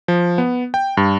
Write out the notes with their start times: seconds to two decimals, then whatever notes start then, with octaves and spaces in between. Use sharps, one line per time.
0.08 F3
0.38 B3
0.74 G5
0.97 G2